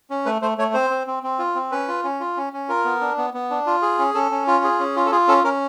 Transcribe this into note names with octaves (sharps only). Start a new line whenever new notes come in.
C#4
A3 B4
A3 C5
A3 C#5
C4 C5
C4
C4
C4
F4
C4
C#4 B4
F4
C#4
F4
C#4
C#4
F4 A#4
B3
D4
B3
B3
D4
F4
G#4
C#4
C#4 A4
C#4
F4
G#4
C#4
F4
A4
F4 G#4
C#4 A4
C#4 A#4